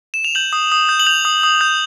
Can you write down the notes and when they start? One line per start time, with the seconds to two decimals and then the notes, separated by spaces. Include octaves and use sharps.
0.14 E7
0.25 F7
0.35 G6 F#7
0.53 D#6
0.72 D#6
0.89 G6
0.99 F#7
1.07 G6 F7
1.25 D#6
1.43 D#6
1.61 G6